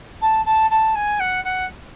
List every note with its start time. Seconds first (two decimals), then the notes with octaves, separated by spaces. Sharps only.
0.22 A5
0.46 A5
0.71 A5
0.95 G#5
1.20 F#5
1.45 F#5